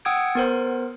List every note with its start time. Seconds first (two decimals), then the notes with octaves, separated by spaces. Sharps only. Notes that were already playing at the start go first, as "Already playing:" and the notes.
0.05 F#5 G5 D#6 E6 G#6 D7
0.35 B3 A#4 C5